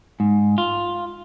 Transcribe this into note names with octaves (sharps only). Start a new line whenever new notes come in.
G#2
F4